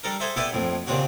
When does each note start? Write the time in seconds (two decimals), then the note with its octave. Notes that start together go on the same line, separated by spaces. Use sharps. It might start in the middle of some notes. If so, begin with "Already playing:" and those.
0.04 G3 D4 A4 A#4
0.20 G#4 A4 C5 E5
0.37 B3 E4 G4 A4 B4 D5
0.53 A#1 F2 A2
0.87 D#2 A#2 C#3 C4 D4 F#4